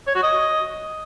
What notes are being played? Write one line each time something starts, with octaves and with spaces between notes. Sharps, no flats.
C#5
F#4
D#5